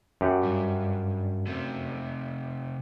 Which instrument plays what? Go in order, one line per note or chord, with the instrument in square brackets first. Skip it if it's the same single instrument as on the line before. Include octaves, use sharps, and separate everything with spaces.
[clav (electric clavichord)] F#2 G4 F#5
[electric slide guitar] G2
C3 A3